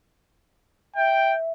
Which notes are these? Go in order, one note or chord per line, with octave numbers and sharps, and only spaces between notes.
E5 G5